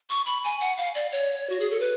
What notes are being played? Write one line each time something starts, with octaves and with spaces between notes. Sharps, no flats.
C#6
B5
G#5
F#5
F5
D5
C#5
F#4
G#4
A4
B4